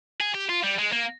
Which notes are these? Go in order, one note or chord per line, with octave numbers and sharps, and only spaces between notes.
G#4
G4
F4
G3
G#3
A#3